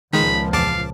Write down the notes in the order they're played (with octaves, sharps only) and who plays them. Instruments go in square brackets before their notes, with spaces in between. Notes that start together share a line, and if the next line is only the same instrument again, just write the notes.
[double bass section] C#2 A#2 F3 [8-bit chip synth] D#3 G#3 [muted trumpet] B5
[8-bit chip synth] E2 A5 D6 [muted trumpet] F5